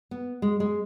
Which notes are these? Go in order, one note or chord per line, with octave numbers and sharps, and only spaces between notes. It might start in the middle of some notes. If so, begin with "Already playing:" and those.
B3
G#3
G#3